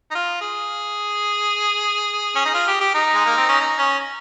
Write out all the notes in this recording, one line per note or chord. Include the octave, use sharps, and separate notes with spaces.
D#4
F4
G#4
C#4
D#4
F4
G4
G4
D#4
G#3
A#3
C4
C#4
D#4
C#4